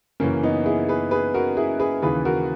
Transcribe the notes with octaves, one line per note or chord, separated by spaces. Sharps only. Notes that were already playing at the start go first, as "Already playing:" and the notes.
F#2 C#3 E3 A#3 C#4
B3 D#4
E4 G#4
G#4 B4
G#4 B4
F#4 A#4
E4 G#4
G#4 B4
D#2 C#3 E3 G#4 B4
F#4 A#4